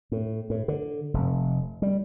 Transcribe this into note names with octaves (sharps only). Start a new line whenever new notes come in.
A2
A2
D3
F1
G3